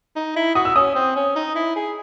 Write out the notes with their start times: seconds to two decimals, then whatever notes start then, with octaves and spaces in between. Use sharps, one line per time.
0.16 D#4
0.36 E4
0.55 F#4 D#6
0.65 E6
0.76 C#4 D#6
0.95 C4
1.16 C#4
1.36 D#4
1.55 E4
1.76 G#4